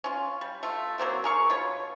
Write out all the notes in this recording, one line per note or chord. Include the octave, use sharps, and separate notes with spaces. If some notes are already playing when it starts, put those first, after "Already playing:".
C#4 F4
G3
A3 F4
F#3 A#3 C4 F#4
G#4 A#4 C#6
B2 F4 C#5